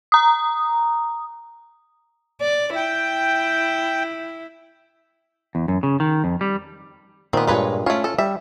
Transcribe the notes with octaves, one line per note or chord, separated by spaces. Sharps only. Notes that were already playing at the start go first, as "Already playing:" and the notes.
A#5 D#6
D5
E4 G5
E2
F#2
C#3
D#3
F2
G3
A#2 D#3 B3 C4
G2 A#2 G#3 F4 B4 C#5
A3 C#4 F4 C#5 F5
A4
G3 E5